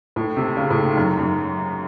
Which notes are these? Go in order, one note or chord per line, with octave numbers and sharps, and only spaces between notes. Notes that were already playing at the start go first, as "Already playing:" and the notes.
A2
C3
C#3
A2
G#2
F#2
G#2
F#2